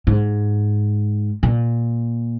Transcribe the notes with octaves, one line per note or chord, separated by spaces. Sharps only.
G#2
A#2